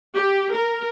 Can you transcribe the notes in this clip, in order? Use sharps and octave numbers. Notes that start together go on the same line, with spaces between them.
G4
A#4